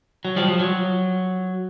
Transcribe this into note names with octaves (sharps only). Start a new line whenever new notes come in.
F#3
F3 G3
F3
F#3